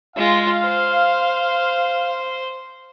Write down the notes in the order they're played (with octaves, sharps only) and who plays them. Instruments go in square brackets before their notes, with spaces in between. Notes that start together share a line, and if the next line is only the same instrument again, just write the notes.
[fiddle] G#3 F4 [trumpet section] F5
[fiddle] C5